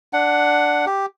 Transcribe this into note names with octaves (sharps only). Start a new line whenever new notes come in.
D4 F#5
G4